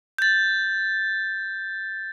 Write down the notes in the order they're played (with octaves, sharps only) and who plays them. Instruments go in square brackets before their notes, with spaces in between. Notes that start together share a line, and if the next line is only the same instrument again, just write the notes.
[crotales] G6 A6